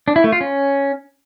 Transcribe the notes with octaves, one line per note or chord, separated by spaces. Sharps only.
D4
E4
A3
F4
C#4